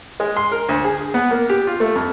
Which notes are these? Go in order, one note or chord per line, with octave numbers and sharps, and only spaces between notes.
G#3
C6
A#4
D2
G#4
B3
A#3
G4
F4
A3
F2